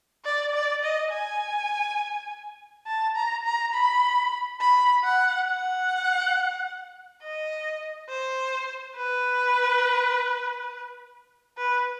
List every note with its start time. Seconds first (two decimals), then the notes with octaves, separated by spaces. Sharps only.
0.25 D5
0.54 D5
0.83 D#5
1.11 G#5
2.87 A5
3.16 A#5
3.45 A#5
3.74 B5
4.61 B5
5.04 F#5
5.48 F#5
7.22 D#5
8.09 C5
8.96 B4
11.58 B4